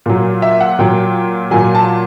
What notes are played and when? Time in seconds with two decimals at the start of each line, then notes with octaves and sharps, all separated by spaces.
0.06 A#2 F#3
0.42 E5
0.60 F#5
0.79 A#2 F#3 G5
1.51 A#2 F#3 G#5
1.75 A5